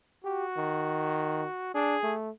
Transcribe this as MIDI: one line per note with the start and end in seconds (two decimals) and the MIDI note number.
0.25 1.73 66
0.25 0.45 67
0.57 1.46 51
1.75 1.96 62
1.75 2.15 68
2.03 2.30 57